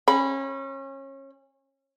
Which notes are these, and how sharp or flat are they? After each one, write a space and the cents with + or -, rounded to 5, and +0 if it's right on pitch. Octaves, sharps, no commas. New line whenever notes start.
C#4 -30 B5 +0